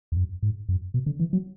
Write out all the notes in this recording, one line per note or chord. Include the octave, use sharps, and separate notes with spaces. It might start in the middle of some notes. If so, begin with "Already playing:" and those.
E2
F#2
G#2
F#2
B2
D3
E3
F#3